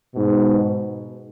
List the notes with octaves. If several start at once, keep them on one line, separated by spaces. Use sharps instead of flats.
G#2 B2